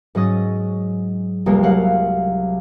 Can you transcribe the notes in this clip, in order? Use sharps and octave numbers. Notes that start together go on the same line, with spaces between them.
G#2 F#3 C#4 D#5 D#6 A6
F1 C2 G3 G#3 A#3
F#3 A3 F5 F#5